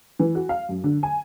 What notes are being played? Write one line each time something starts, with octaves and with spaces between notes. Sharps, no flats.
E3
F#4
F5
F#2
D3
G#5